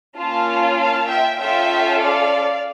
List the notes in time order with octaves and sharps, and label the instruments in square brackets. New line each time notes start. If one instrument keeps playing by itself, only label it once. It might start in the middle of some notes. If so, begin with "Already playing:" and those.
[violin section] A#3 C#4 F4 F5 A5
F5 A5
E5 G5
C#4 F4 A4 E5 G5
D5 F5